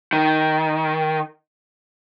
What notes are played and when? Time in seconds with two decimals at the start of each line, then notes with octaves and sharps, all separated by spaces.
0.13 D#3